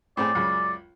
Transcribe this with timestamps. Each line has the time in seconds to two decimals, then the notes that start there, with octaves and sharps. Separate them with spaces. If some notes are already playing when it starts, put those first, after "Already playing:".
0.17 A2 C4 G#4 D5
0.35 C#2 F#2 C#3